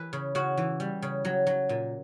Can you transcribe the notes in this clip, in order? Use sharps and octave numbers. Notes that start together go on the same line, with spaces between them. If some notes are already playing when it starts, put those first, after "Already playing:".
Already playing: E3 B4
C#3
C#3 F#4
E3
G3
C#3
F#3
F#3
A#2